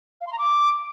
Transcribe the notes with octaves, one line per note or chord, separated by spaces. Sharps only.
F5
C6
A#5
D6